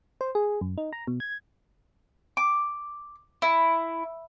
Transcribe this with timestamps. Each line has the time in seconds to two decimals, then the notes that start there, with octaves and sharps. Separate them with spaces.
0.21 C5
0.35 G#4
0.61 F#2
0.78 D#4
0.93 A#5
1.07 B2
1.20 G#6
2.37 D6
3.42 E4